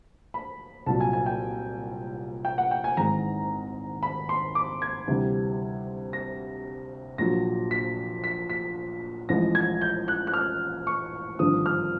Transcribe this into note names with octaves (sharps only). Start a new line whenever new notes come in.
B5
C2 A#2 F#3 A5
G#5
G#5
G5
G5
F#5
G5
G#5
G#1 G#2 E3 G#3 A#5
B5
C6
D6
G#6
D2 C3 E3 G3
A#6
A#1 A#2 F#3 A#6
B6
B6
B6
A1 A2 F3 G#3 A#6
G#6
G6
F#6
F#6
F6
C#6
G#1 G2 D3 F3 D#6
F6